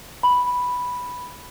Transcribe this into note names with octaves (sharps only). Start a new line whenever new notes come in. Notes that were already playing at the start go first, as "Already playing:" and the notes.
B5